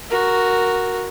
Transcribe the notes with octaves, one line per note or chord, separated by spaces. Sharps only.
F#4 A#4